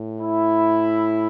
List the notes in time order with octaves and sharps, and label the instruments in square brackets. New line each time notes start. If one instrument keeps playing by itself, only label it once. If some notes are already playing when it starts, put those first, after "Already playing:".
Already playing: [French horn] A2
[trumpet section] E4